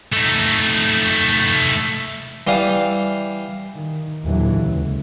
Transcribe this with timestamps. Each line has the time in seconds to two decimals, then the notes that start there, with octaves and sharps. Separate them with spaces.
0.12 A3 D#4
2.47 E3 G3 D5 F5 D#6
3.73 D#3
4.26 D#2 A#2 D3 E3 F#3
4.59 C#2